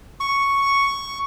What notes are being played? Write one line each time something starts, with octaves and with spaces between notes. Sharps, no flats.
C#6